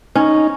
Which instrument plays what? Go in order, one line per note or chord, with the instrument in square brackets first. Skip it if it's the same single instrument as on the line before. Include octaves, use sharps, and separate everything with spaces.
[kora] C#4 [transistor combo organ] D#4